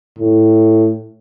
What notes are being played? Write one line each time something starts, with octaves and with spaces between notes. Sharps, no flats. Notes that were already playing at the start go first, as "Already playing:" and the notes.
A2